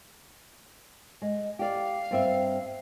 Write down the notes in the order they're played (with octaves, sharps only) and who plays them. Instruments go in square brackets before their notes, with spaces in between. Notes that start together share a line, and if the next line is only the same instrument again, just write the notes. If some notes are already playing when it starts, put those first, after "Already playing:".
[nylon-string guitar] G#3
[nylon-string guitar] G4 D5 [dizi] F5
[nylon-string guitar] G2 C4 E5